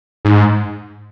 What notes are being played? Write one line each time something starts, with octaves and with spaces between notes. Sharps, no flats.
G#2